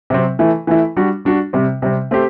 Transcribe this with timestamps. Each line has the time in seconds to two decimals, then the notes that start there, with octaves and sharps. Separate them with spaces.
0.10 C3 F#3 C4
0.39 E3 A3 E4
0.67 E3 A3 E4
0.96 G3 D4 F#4
1.25 G3 D4 F#4
1.53 C3 G3 C4
1.82 C3 G3 C4
2.11 A3 C4 G4 C5